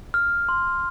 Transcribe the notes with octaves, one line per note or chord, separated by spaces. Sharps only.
F6
C6